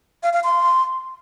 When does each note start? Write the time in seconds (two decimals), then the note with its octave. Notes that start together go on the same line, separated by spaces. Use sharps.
0.23 F5
0.33 F5
0.44 C6